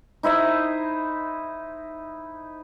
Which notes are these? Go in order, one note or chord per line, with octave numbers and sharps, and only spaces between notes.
D#4 E4 C5 D#5